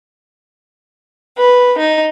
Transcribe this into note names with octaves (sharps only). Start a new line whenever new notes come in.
B4
D#4